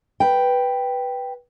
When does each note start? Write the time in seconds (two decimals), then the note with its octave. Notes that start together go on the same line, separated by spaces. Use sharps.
0.20 B4 G5